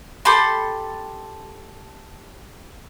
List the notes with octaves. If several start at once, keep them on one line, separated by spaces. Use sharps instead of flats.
G4 A4 B5 C6